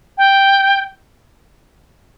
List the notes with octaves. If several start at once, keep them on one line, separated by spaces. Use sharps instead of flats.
G5